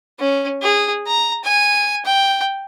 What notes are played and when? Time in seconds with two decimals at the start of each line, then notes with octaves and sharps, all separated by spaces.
0.19 C#4
0.62 G#4
1.07 A#5
1.44 G#5
2.05 G5